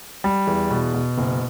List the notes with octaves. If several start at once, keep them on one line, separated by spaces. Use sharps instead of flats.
G3
E2
B2
B2
F#1